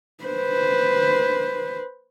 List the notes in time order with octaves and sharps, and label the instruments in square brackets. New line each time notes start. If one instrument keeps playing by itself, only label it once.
[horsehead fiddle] B4 C5